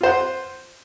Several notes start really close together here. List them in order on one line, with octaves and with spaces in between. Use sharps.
F4 C5 F#5